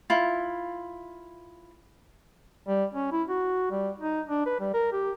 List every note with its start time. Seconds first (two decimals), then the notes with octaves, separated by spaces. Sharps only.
0.10 E4 F4
2.68 G3
2.94 C#4
3.12 E4
3.28 F#4
3.71 G3
3.99 D#4
4.27 D4
4.46 B4
4.60 G3
4.74 A#4
4.92 G4